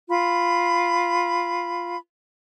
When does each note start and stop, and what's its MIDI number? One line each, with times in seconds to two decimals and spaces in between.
0.09 1.97 65
0.09 1.97 83